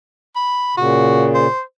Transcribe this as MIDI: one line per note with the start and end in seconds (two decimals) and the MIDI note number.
0.36 0.76 83
0.77 1.47 46
0.77 1.47 49
0.77 1.28 66
1.35 1.61 72